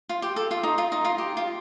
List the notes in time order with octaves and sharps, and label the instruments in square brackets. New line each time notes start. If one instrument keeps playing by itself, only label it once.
[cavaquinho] F4
G4
A4
F4
D#4
F4
D#4
F4
G4
F4